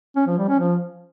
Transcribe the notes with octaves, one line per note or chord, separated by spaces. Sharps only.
C#4
F3
G3
C#4
F3